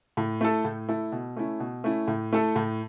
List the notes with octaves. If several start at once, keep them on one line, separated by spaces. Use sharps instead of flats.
A2
A3 E4 A4
A2
A3 E4 A4
B2
A3 C#4 E4
B2
A3 C#4 E4
A2
A3 E4 A4
A2